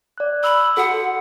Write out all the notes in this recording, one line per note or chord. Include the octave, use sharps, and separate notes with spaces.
D5 F#6
B5 E6
F#4 A4 F#5